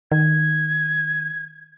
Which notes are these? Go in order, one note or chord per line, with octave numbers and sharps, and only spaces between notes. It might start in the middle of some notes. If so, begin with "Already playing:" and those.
D#3 G#6